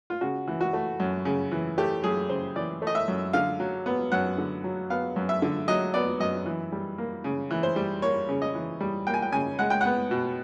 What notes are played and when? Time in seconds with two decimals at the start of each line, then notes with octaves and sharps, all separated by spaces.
0.10 F4
0.21 C#3 F#4
0.48 E3
0.61 F#4
0.73 A3
1.00 F#2
1.25 C#3
1.52 E3
1.78 A3 G4
2.04 F#2 G#4
2.29 C#3 C5
2.56 E3 D5
2.82 A3
2.87 D#5
2.95 E5
3.08 F#2
3.33 D3 F5
3.60 F#3
3.86 B3
4.12 F#2 F#5
4.38 D3
4.64 F#3
4.90 B3 F5
5.16 F#2
5.29 E5
5.42 D3
5.68 F#3 D#5
5.94 B3 D5
6.20 F#2 D#5
6.46 E3
6.72 G3
6.98 A#3
7.24 C#3
7.51 E3
7.63 C5
7.76 G3
8.02 A#3 C#5
8.29 C#3
8.42 D#5
8.55 E3
8.80 G3
9.07 A#3 G5
9.14 G#5
9.22 G5
9.32 C#3 G#5
9.59 G#3 F#5
9.70 G5
9.81 B3 F#5
10.11 B2